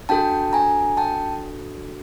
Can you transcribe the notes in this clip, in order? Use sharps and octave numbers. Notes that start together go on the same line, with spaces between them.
D4 F#4 A4 G5 A5
G#5 A#5
G5 A5